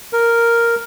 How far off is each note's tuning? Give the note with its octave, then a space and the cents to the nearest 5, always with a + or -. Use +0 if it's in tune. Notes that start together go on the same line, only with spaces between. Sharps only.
A#4 +0